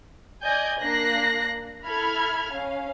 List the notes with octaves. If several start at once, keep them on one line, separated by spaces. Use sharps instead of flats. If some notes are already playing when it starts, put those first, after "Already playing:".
D5 D#5 G#5 G6
A#3 D4 F#6 A#6 C7
E4 A4 B5 F6 G#6
C#4 F5